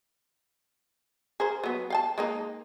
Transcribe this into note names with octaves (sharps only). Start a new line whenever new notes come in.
G#4 A#4 C5
F#3 B3
F5 G5 A5
G#3 A#3 D#4